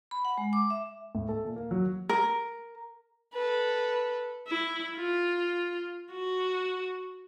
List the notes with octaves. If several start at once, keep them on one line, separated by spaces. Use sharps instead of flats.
B5
F#5
G#3
D6
E5
A2
A4
A#2
A#3
F#3
A#4
A4 B4
E4
F4
F#4